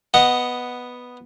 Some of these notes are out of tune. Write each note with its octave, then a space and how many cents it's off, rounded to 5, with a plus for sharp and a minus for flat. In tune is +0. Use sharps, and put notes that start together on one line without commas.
B3 +0 D#5 +0 F#5 +0